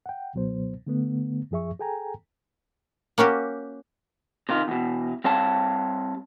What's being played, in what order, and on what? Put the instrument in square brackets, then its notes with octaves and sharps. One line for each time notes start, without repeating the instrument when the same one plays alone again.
[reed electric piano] F#5 G5
C#2 B2 F#3 B3 C5
D3 A3 B3
F#2 F3 G#4 E5 C#6
G#4 A4 G5 G#5 A#5
[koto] A#3 C#4 F#4 G4
[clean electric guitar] C3 D#3 F4
E2 B2
G3 C4 C#5 F5 A5